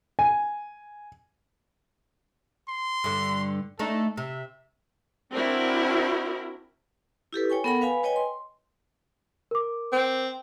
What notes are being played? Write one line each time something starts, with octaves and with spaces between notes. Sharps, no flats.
G#5
C6
G2 D3
A3 D4 D#4 A4
C3 E5
C4 D4 E4 F#4 A#4
E4 G4 A4 B4
C#5 G5 G#5 C#6
B3 A4 A#4 F#5 G5 B5
B4 F5 G#5 B5
B4 C#5 D#5 G5 G#5
C6
A#4 D6
C4